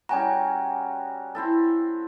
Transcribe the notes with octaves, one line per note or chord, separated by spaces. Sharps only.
G3 C#4 F#4 G5 G#5 A#5
C4 E4 A4